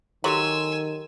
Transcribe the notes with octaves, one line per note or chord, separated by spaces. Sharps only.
D#3 F#3 G4 A4 G#5 C6 E6